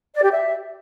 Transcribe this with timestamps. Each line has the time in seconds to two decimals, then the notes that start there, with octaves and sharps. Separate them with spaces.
0.15 D5
0.23 G4
0.31 E5